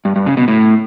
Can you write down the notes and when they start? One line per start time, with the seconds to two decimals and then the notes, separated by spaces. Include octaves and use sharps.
0.05 G2
0.16 G2
0.26 C#3
0.37 B2
0.48 A2